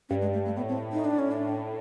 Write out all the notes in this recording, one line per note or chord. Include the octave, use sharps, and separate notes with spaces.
G2 C#4
G#3
A3
A3
A2 B3
C4
D#4
D4
C#4
D4